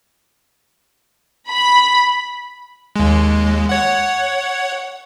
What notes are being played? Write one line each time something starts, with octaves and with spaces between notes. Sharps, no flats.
B5
D#2 G#3
C#5 F#5